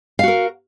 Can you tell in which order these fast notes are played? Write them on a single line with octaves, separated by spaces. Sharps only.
F5 F#4 A#4